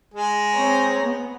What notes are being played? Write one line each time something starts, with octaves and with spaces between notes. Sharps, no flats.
G#3 G#4
C4 C#5 A#5
B3